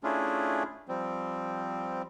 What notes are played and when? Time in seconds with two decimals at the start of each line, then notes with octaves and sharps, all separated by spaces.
0.04 A3 C#4 D4 E4 F4 G#4
0.89 F3 G3 C4